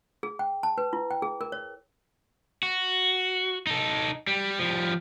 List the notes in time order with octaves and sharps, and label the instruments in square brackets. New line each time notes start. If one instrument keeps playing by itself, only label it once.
[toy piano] G#4
G5
A5
B4
E4
G5
G#4
A#4
C#5
[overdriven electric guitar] F#4
D#4 A4
G3
F3 G3